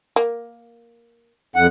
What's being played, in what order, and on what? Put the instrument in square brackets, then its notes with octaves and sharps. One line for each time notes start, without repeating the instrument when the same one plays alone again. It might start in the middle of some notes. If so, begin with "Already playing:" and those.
[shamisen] A#3
[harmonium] F2 F#5